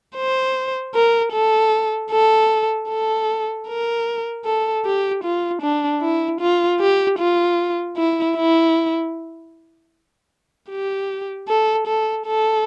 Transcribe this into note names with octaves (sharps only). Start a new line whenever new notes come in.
C5
A#4
A4
A4
A4
A#4
A4
G4
F4
D4
E4
F4
G4
F4
E4
E4
G4
A4
A4
A4